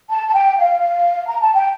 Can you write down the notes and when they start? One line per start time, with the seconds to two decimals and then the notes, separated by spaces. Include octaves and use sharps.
0.10 A5
0.28 A5
0.34 G5
0.58 F5
1.28 A#5
1.42 A5
1.54 G5